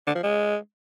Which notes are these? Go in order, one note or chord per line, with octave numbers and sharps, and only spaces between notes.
D3
F3
G#3